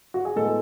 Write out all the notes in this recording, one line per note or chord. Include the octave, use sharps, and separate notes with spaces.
F#4
G#4
A2 G#3 B3 A4